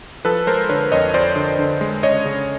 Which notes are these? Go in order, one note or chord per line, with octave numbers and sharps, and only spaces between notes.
F3 A4 B4
G#3 A#4 C5
D3 B4 C#5
F2 C#5 D#5
F2 C5 D5
D3
D3
G#3
C#3 C#5 D#5
C#3